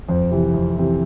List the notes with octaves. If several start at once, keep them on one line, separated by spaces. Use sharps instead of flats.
F2 C5
C3 E3
F2
C3 E3